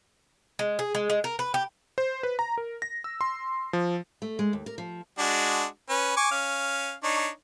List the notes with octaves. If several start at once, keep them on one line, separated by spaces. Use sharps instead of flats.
G#3
G#4
G#3
G#3
A#4
B4
G4
C5
B4
A#5
A#4
A#6
E6
C6
F3
A3
G#3
D#2
A#4
F3
G#3 D4 F#4
C#4 B4
G#5 C#6 D6
C#4 F5
D4 D#4 C#5